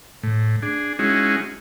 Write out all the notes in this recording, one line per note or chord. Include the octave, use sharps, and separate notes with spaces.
A2
D4 G#4
G#3 C#4 D#4 E4 F#4 G#4